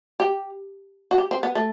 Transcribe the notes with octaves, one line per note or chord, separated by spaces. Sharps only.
G4
F#4
G4
C4
B3
A3